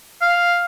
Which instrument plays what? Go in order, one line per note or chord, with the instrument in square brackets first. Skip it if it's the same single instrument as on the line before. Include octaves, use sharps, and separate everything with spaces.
[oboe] F5